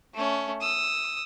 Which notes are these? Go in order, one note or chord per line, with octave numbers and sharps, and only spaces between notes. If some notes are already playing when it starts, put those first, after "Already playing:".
A3 C#4
D#6 E6